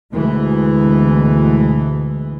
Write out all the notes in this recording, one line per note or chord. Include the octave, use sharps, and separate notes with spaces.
D2 B2 E3 G#3